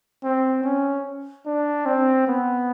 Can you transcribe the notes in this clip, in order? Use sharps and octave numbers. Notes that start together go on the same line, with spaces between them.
C4
C#4
D4
C4
B3